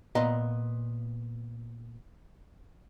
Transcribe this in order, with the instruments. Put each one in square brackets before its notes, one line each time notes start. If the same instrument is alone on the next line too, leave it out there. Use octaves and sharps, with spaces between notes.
[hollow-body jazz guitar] A#2 B3 D#5 F5 A#5 C6